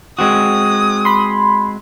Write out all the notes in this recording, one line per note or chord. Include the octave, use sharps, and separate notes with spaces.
G#3 C4 F#4 D#6
B5 C6